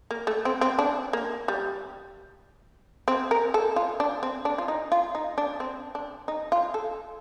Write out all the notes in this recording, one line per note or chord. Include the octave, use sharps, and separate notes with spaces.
A#3
A3
C4
C4
D4
A#3
G3
C4
A#4
A4
F4
D4
C4
D4
F4
D#4
F4
D#4
D4
C4
D4
D#4
F4
A4